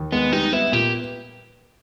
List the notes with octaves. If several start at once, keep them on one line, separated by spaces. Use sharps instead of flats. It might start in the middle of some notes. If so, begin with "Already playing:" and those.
Already playing: D#2
G#3 B3
G3 D#4
B3 E4
A#2 G4